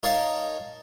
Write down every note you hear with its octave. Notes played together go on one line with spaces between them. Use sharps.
D#4 A#4 C#5 D#5 F5 A5